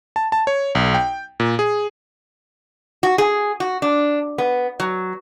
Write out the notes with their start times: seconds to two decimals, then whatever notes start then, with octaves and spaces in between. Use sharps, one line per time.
0.16 A5
0.32 A5
0.47 C#5
0.75 B1
0.94 G5
1.40 A#2
1.59 G#4
3.03 F#4
3.18 G#4
3.60 F#4
3.82 D4
4.38 B3
4.80 F#3